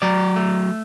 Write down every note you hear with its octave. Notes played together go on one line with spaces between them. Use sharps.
F#3 D5
A3